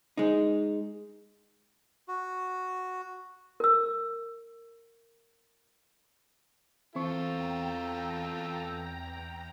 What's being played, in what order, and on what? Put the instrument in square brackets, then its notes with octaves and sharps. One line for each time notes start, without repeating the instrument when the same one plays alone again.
[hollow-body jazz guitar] G#3 D#4
[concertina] F#4
[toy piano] A#4 E6
[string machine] E2 G5 A#5 [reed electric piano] E3 C4 C#6 [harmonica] F4 A4